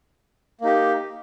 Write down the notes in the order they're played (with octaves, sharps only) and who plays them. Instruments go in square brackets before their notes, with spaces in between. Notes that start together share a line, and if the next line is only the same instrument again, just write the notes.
[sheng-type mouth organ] A#3 D#4 G4